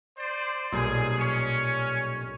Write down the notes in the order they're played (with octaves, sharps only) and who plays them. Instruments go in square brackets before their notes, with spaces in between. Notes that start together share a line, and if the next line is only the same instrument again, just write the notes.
[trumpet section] C5 D5
[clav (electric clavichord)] B1 A#2 G3 [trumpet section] G#4
[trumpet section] C#4 C#5